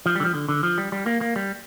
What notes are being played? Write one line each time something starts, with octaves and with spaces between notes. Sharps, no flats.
F3
D3 G3
F3
D3
D3
F3
G3
G3
A#3
A#3
G3